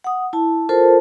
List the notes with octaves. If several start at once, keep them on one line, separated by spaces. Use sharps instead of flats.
F#5 D#6
E4 A5
F4 A4 A#4 C5 A5